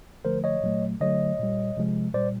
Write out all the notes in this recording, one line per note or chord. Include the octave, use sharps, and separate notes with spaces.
D3 F3 A3 A#4 C5
C#5 D#5
A#2 F#3 A3
D3 F#3 A3 C#5 D#5
A#2 G3
C3 F3 G#3
A#2 G3 C5 D5